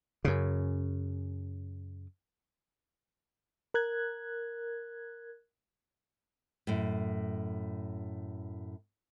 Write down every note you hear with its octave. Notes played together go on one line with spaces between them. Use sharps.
F#2 C#3
A#4 F#6 G#6
F#2 A2